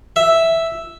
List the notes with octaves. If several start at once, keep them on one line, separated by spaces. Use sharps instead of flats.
E5